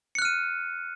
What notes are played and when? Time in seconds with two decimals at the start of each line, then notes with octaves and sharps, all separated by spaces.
0.15 C#7
0.19 F#6
0.22 F6
0.25 D#7